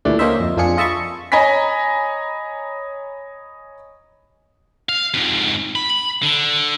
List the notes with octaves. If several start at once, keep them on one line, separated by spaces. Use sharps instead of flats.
D2 A#2 E3 G3 A3 D4
A#3 C#4 D#4 C5 E5
F2
F2 D4 F4 G#4 C#7
F4 D#5 E5 A5 B5 C#6
C#5 D#5 G#5 A#5 B5 B6
F5
F2 G#2
B5
D3